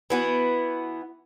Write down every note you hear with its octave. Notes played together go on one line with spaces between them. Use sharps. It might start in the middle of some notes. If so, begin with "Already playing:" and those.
E3 B3 F#4